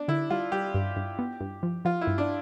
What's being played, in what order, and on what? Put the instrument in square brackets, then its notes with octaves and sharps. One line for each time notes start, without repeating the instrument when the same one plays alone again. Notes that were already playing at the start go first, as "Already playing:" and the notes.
Already playing: [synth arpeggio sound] B3 [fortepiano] D4
[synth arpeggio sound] D3 [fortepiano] E4
[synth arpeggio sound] G3 [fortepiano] F4
[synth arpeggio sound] G3 [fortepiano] G4
[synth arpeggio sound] G2
G2
B3
G2
F3
[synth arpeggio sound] F3 [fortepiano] F4
[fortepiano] E4
[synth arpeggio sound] G2
[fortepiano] D4